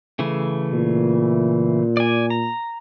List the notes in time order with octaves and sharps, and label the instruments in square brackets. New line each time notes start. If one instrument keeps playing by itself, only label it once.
[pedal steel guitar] C#3 E3 A3
[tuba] A#2
[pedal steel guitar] D5 G#5
A#5